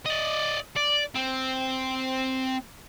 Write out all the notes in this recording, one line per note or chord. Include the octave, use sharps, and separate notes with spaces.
D5 D#5
D5
C4